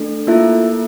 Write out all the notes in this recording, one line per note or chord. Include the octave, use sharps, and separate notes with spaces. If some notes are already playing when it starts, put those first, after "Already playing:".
Already playing: A3 D4 A4
A#3 E4 F4 A4 E5